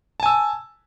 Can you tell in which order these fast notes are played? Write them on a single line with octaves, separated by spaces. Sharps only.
A5 G#5 E6